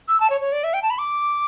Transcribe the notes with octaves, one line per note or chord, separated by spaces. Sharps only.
E6
A5
C#5
C#5
D5
E5
G5
A5
B5
D6